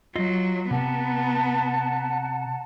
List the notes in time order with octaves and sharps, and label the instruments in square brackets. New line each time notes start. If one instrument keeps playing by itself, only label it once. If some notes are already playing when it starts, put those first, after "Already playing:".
[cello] F#3 [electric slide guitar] F4 D#5
[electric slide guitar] C3 [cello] B3 [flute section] F#5 A5 A#5